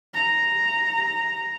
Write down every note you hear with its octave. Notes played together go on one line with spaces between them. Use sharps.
A#5